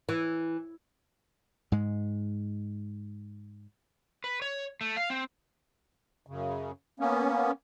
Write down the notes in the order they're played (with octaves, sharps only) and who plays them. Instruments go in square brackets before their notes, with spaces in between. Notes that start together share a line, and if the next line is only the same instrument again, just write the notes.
[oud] E3
[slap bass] G#2 G#3
[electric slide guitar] B4
C#5
A3
F5
C4
[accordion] F#2 C#3
A#3 B3 C#4